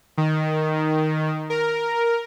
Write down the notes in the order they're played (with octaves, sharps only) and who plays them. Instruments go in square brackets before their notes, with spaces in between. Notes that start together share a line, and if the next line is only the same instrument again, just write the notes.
[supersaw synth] D#3
A#4